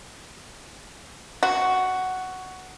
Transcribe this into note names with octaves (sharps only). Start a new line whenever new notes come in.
F#4